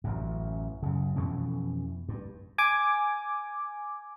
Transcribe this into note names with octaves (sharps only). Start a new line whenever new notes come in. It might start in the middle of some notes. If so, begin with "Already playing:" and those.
A1 F#2
F#2 C#3
F2 B2 E3 C#4
G2
G#5 D6